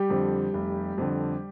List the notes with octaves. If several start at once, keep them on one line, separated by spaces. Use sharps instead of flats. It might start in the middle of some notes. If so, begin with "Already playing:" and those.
Already playing: G3 G4
F2 D3
F1
F2 D3